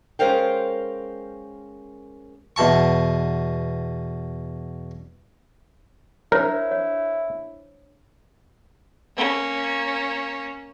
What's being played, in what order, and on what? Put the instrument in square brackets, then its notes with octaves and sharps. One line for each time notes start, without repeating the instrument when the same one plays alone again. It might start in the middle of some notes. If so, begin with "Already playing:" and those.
[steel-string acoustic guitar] G#3 C#4 A#4 C5 F5 G5
[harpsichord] E2 B2 A5 C#6
[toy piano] D4 C5 C#5 [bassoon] E4 [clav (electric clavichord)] A#4
[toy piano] C#5
[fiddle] A#3 C#4